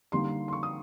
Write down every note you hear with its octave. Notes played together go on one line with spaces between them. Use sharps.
D3 G3 A#3 D#4 C6
C6
C#6
D#6